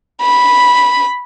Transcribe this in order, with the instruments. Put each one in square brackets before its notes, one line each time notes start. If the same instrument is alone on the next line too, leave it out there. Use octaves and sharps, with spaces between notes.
[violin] B5